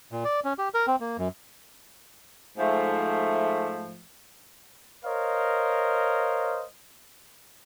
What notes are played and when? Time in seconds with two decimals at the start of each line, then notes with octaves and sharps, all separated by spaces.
0.12 A#2
0.25 D5
0.45 C#4
0.58 G4
0.74 A#4
0.87 C4
1.00 A#3
1.18 F#2
2.57 G#2 F3 A3
5.05 A#4 C5 C#5 D#5 F5